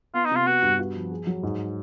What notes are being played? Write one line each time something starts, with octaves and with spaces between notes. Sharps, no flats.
B3 F4
D#4
C3 F4
B3 F#4
G2
F#4
F3
G#4
F#3
G#2